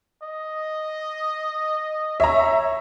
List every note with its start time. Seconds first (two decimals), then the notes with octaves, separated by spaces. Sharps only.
0.23 D#5
2.20 C#5 E5 A#5